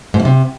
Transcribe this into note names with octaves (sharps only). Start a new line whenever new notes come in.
G#2
F#2
C3